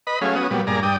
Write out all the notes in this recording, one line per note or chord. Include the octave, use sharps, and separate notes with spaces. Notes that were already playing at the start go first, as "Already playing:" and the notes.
B4 D#5 B5
F#3 A3 C#4 G#4 F5
B3 C#4 F#4 D#6
A#2 F#3 G3 B3
G2 A#2 G#4 D5 A#5
G2 D5 G5 D#6